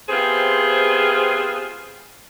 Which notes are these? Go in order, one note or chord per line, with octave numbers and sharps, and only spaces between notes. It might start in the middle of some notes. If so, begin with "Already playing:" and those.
C3 B3 C4 F4 G#4 C5